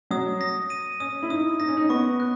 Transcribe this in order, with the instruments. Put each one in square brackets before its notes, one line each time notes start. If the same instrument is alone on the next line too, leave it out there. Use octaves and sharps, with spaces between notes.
[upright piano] F#3 [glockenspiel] D#6
[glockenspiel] A#6
D#7
[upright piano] C#4 [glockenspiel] D#6
[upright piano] E4
[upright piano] D#4 [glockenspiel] D#6
[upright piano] D#4 [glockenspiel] A#6
[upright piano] C#4
D#4
[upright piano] B3 [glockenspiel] C#6
[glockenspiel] F#6